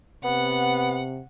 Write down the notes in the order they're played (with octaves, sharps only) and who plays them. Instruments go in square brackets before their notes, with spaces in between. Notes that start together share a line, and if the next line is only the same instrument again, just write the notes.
[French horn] C3 [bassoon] B3 [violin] F#5